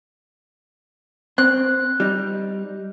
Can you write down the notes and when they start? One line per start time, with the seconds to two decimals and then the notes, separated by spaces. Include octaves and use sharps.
1.38 C4 F#6
2.00 G3 D#4